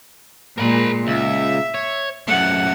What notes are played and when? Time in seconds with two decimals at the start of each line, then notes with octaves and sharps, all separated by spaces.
0.58 A#2 G#3 A#4 B5
1.07 C#2 E5
1.74 C#5
2.28 F#2 A3 F#5